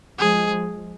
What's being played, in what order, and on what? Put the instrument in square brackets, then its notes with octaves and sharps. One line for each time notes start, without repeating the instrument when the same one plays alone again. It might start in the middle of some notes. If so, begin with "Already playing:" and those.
[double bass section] F3 G#3 [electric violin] G#4